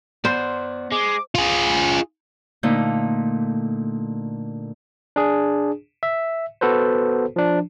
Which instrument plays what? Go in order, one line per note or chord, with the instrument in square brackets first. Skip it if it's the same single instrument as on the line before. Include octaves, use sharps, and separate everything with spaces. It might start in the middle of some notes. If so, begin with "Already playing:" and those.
[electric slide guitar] B3 D5 [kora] C5
[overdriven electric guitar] G#3 [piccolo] D6
[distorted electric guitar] F4 G#4
[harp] A#2 D3 A3 D#4
[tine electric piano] D4 G#4
E5
B3 F#4 A4 B4 C5
F3 D4